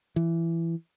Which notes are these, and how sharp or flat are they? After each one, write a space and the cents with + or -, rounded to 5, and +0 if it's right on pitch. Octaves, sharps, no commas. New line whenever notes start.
E3 +15